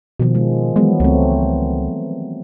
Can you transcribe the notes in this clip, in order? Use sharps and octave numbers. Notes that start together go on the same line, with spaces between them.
B2 D#3 F3
G#3
E3 F#3 G#3 B3
C#2 A3 C4